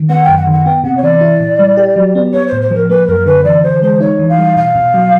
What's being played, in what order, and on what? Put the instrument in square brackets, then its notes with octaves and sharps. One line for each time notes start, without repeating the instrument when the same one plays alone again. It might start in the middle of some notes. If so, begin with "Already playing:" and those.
Already playing: [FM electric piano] D#3
[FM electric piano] B3 [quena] F#5
[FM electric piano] F#2 [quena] G5
[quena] F#5
[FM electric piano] D#3
[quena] F#5
[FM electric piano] B3 [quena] G5
[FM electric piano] C3 [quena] F#5
[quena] C#5
[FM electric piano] E3 [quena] D5
[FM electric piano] E4
A#2
G3
G4
F#3
B3
[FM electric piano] B3 [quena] C#5
[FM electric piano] A2 [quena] C5
[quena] C5
[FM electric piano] F3 [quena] A#4
[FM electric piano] A#3 [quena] B4
[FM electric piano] F#2 [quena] A#4
[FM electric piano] D3 [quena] B4
[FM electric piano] E3 [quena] D5
[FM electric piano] E3 [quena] C5
[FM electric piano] G#3 [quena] C5
[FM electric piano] D#4 [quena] C#5
[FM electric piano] E3
[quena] F5
[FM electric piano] G3
[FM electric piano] B2 [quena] F5
[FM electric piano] B2
F#3